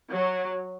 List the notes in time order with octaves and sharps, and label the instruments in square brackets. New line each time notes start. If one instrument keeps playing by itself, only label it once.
[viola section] F#3